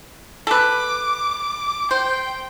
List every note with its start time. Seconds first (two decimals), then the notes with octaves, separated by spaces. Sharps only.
0.47 A4 B4 D6
1.91 C5 G5